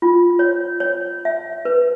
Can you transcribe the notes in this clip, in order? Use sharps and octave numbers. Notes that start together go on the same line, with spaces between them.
F4
C#5
C#5
E5
B4